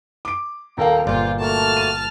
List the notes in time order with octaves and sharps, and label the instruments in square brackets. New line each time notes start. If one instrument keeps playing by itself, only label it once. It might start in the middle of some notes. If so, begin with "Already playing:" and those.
[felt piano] D6 D7
[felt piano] D#1 A4 F5 [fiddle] A#3 [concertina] G5
[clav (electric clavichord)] G1 A#2 [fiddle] F4 [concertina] C5 D6 [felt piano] D5
[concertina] A3 A#3 F#4 [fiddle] A5 F6
[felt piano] D#7